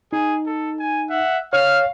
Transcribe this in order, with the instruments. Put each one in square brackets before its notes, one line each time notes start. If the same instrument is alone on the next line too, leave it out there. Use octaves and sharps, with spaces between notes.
[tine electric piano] D#4 [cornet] G#4
[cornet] A4
G#5
[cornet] E5 [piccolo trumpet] F#5
[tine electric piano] C#5 [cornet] F5 [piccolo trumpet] F6